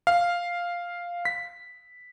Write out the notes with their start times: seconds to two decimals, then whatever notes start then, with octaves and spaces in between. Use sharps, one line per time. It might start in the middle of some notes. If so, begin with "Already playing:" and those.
0.07 F5
1.25 B6